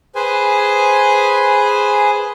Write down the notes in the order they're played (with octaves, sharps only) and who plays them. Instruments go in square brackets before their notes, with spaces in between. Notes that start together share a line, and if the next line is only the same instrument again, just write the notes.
[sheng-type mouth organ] G#4 B4 C5 G#5